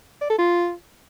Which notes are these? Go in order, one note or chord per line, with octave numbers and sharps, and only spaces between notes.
D5
A4
F4